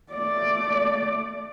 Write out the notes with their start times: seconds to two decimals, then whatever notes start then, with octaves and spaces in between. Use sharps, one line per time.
0.13 A3 D5